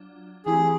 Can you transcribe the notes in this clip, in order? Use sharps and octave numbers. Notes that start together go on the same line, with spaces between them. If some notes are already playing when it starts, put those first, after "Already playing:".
Already playing: F#3 D4 F4
E3 A3 C4 E4 G4 G#4